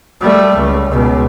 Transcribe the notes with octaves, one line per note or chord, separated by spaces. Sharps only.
G3 A3
C#2
C#2 B2